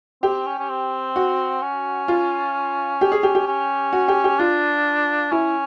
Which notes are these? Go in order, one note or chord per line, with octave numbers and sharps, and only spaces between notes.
C4 G4
C#4
C#4
C4
F#4
C#4
F4
G4
G#4
G4
G4
C#4
F#4
G4
G4
D4 F4
C#4 E4